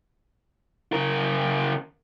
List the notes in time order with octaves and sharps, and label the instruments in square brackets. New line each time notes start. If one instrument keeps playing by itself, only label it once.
[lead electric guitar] C#3 A#4